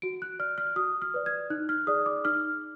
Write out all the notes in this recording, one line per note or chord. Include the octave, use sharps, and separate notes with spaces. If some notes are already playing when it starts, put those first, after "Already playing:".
F#4 D7
F#6
D5 F6
F6
F#4 D#6
F6
B4 D5
G#6
D#4 F#6
F6
G#4 D5 D#6
D6
D#4 F6